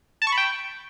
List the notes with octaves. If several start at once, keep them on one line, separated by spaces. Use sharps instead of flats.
A5
C#6
B5
G5